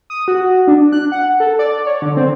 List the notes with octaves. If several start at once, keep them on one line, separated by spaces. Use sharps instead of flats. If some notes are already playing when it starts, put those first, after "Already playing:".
D#6
F#4
D4
F#6
F#5
A4
D5
C#5
D3
C4